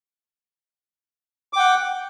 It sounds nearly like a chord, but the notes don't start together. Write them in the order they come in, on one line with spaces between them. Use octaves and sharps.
D6 G5 F#5